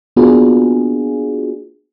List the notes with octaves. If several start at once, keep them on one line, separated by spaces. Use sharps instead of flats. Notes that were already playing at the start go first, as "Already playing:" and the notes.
A#3 B3 D4 F4 F#4 G#4